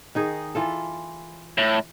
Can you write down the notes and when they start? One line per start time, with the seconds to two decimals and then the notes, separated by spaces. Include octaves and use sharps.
0.15 D#3 D#4 G#4
0.55 E3 F4 A4
1.58 A2